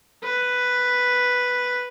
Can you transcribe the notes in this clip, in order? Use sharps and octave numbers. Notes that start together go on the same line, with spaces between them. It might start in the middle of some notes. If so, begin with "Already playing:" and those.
B4